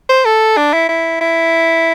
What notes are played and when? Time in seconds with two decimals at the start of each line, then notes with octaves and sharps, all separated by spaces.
0.09 C5
0.25 A4
0.57 D4
0.73 E4
0.89 E4
1.21 E4